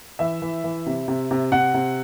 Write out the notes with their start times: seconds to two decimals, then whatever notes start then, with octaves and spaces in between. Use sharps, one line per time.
0.19 E3 E5
0.42 E3
0.64 E3
0.86 C3
1.08 C3
1.31 C3
1.52 C3 F#5
1.74 C3